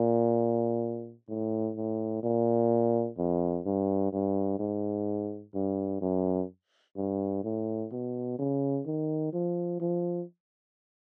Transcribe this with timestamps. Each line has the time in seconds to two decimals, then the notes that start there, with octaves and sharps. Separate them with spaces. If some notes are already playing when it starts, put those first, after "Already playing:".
Already playing: A#2
1.29 A2
1.77 A2
2.23 A#2
3.18 F2
3.66 G2
4.13 G2
4.59 G#2
5.55 G2
6.01 F#2
6.97 G2
7.44 A2
7.92 B2
8.39 C#3
8.87 D#3
9.33 F3
9.80 F3